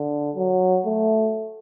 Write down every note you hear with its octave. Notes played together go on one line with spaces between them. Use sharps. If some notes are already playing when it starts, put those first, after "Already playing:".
Already playing: D3
F#3
A3